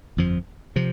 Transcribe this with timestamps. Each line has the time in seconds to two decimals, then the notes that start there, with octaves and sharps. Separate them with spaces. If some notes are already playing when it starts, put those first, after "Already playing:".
0.17 G1 F2 F3
0.76 C3 F3